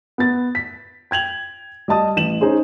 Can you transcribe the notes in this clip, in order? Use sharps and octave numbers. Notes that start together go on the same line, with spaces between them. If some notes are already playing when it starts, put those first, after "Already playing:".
B3 A6
B6
G5 G#6 F7 F#7
G3 D#5 A5 D#6
A1 E7 F#7
C#4 D#4 G#4 C5